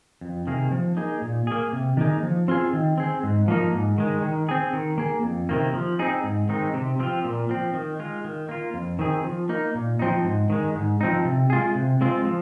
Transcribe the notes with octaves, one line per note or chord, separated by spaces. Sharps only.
F2
C3 D#3 A#3 G#4
F3
A#3 D#4 G#4
A#2
A#3 G#4
C3
D#3 A#3 D#4 G#4
F3
C4 F4 G#4
D#3
C4 G#4
G#2
F3 A#3 D#4
G#2
D#3 G#3
D#3
C4 G#4
D#3
A#3 G#4
F2
C3 D#3 A#3
F3
C4 D#4 G#4
G#2
D#3 G#3 C4 D#4
C3
F3 C4 F4
A#2
F3 C4
D#3
G#3 F4
D#3
A#3 F4
F2
D#3 C4 G#4
F3
A#3 D#4
A#2
F3 C4 D#4
G#2
D#3 G#3
G#2
F3 C4 D#4
C3
G#3 F4 G#4
C3
G#3 C4 F4
F3